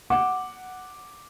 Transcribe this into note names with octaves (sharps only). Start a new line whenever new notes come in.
F#5 D6